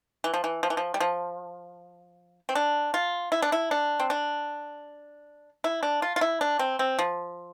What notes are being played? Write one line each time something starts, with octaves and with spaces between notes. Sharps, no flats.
E3
F3
E3
F3
E3
F3
G3
F3
C4
D4
F4
E4
D4
E4
D4
C4
D4
E4
D4
F4
F4
E4
D4
C4
C4
F3